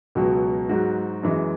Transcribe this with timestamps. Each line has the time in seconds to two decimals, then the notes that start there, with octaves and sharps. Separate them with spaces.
0.15 C#2 B2 F#3
0.69 G#2 F#3 F#4
1.23 F#2 E3 G#3